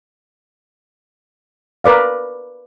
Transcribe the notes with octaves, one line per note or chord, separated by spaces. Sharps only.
A#4 B4 D5 F5